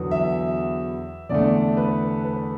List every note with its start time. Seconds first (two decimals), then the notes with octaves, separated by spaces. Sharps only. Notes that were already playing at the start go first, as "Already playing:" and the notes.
Already playing: E2 D3 F#3 B3
0.11 E5
1.29 E2 D3 A3 D5
1.77 B4
2.25 B4